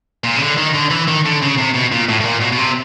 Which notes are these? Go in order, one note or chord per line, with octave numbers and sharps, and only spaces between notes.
A#2
C#3
D3
D#3
D3
E3
D#3
D3
C#3
C3
B2
A#2
A2
A2
A#2
B2
B2
C3